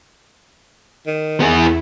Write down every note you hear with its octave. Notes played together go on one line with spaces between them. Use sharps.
D#3
E2 B3 E4 G#4